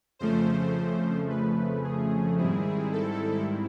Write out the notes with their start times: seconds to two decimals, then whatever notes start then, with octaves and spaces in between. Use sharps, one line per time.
0.19 F2 C#3 F3 A3 C5
1.30 B4
1.84 G#4
2.38 G#2 D#3 G3 C4 E4 G#4
2.92 A4